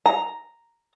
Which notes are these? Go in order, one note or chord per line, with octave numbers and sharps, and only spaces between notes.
A#5